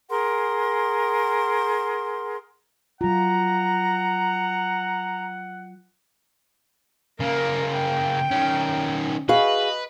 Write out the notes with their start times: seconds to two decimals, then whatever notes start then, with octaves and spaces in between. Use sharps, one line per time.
0.10 G#4 A#4 F#5 C6
3.01 F#3 F4 F#5 A#5
7.20 C#3 A#3 A#4
7.72 G5
8.31 D#3 C#4
9.29 F#4 G#4 B4 D#5 F5